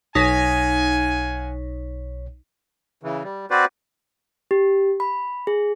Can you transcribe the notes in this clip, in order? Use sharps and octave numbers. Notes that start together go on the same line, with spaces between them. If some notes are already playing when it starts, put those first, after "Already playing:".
B1 D#4 C#5 F5 F#5 G#5 B6
C#3 E3
G3
C4 F#4 B4 C5 D5
G4
B5
G#4